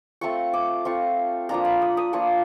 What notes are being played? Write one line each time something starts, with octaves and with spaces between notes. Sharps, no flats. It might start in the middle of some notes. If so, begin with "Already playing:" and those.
A3 C4 F4 C#6
D6
A3 C4 F4 C#6
F3 A#3 D4 F4 A#5
B5
D#6
D#6
F3 A#3 D4 F4 C#6